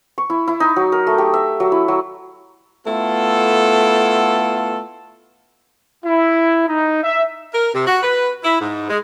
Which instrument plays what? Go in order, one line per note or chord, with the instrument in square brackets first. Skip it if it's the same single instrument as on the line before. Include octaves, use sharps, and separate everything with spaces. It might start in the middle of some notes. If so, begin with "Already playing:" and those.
[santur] C#6
E4
E4
D#4
F#3
A#4
A3
G4
E5
F#3
E4
F#3
[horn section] A3 B3 E4 F4 A4
E4
D#4
E5
[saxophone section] A#4
C3
F#4
B4
E4
G#2
G#3